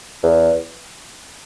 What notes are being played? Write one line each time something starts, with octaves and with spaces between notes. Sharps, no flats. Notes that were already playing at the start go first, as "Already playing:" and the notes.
E2